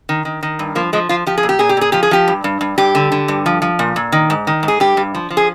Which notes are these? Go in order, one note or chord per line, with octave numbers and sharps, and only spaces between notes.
D#3
D#3
D#3
G2
F3 A#3
F3 G#3
F3 F4
F3 G4
G#4
A#2
G4
A#2 G#4
G4
A#2 G#4
F3 G4
G#4
F3 G4
G2
G2
G2
G2 G4
D3
D3
G2
F3
F3
A#2
A#2
D#3
G#2
D#3
G#2
G#4
G2 G4
G2
F3
F3
G#4